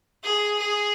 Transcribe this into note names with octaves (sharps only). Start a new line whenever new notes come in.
G#4
G#4